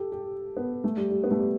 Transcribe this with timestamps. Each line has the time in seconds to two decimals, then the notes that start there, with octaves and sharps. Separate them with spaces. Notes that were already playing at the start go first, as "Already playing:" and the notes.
Already playing: G4 A4
0.12 G4
0.57 B3
0.84 A3
0.97 G3
1.10 G3
1.24 B3
1.31 A3
1.39 G3